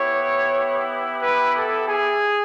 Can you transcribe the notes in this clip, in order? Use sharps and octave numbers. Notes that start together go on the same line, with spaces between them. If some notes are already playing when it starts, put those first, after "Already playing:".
Already playing: B3 E4 G4 C#5
B4
A4
G#4